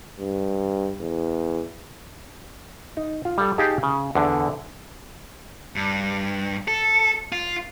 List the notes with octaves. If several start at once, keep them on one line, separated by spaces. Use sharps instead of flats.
G2
E2
D#4
F4
G3 A4
D#4 G4 G#4 F5 A5
C#3
E2 D3
G2
A4
F4